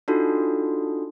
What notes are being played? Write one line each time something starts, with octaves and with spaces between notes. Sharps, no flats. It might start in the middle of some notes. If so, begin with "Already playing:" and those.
D4 D#4 F4 F#4 A4